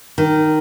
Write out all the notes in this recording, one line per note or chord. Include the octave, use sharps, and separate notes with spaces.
D#3